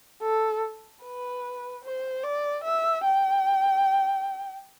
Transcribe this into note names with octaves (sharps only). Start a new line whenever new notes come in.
A4
B4
C5
D5
E5
G5